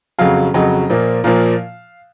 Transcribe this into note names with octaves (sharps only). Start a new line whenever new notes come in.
F2 C#3 F#3 F5
F2 C#3 F#3 D#5
A#2 F3 A#3
A#2 F3 A#3 F5